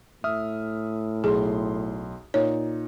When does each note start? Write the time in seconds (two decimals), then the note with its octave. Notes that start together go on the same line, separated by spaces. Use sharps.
0.24 A2 E5 D#6 F6
1.24 B1 G#4 C6
2.34 A#2 D#4 C#5